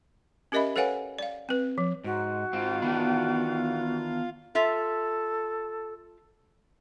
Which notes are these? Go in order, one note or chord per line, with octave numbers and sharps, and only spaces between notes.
C#4 G4 A#4 D#5 E5 B5
A4 B4 C#5 F5 F#5 G#5
D5 F5
C4 B4
F3
G#2 F#4
G#2 C4 F4 F5
D#3 E3 B3 D4
F4 A4 E5